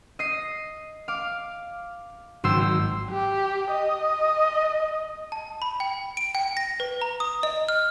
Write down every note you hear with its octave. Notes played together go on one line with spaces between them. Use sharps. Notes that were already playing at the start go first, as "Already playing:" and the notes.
D#5 D#6 C7
F5 D6
G#1 F#3 C5 C6 E6
G4
D#5
A5
B5
G5
D7
G5
A#6
B4
A#5
D#6
D#5
F6